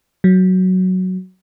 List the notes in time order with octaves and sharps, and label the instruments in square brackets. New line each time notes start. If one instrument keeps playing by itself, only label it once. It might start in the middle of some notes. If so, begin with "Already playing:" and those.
[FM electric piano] F#3